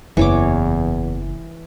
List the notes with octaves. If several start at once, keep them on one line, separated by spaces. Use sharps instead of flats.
F#1 E2 E3 C#5 D6